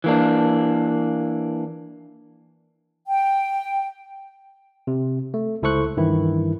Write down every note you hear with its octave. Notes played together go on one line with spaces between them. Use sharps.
E3 A#3 D4
G5
C3
A3
C#2 E4 A4 C5 C#6 F#6
G2 D#3 E3 E4